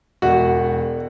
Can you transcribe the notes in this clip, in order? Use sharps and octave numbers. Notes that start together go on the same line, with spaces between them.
E1 F#4